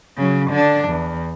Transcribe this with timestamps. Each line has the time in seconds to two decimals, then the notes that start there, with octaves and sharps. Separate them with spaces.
0.17 C#3 F#3
0.50 D3 D4
0.88 E2